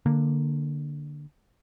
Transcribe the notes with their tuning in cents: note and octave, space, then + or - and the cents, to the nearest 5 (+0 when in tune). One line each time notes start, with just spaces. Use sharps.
D3 +10 A#3 +0